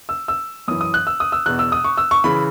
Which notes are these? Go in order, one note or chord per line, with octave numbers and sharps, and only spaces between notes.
E6
E6
F#2 E3 D#6
D#6
F#6
E6
D#6
E6
E2 B2 F#6
E6
D#6
C#6
E6
C#6
C#3 E3 B5